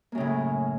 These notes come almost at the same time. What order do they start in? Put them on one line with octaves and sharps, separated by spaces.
A#3 F#2 C#3 A2